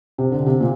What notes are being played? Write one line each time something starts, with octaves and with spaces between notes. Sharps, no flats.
C3
D3
C3
A#2